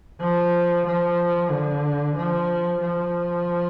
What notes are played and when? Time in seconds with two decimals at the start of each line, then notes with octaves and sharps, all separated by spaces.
0.20 F3
0.86 F3
1.50 D3
2.15 F3
2.81 F3